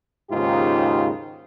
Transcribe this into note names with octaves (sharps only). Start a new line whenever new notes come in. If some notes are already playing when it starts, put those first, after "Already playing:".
D#2 G#2 C#3 D#4 F4 G4